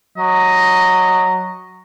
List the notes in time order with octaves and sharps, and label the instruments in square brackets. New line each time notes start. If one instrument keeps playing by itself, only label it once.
[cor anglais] F#3 [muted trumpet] D#5